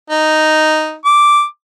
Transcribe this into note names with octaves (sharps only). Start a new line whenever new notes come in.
D#4
D6